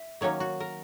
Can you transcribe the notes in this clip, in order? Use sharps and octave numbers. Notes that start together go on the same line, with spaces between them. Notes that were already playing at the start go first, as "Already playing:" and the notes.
Already playing: E5
D#3 F#3 A#3 C#4 C#5
F#4
A#4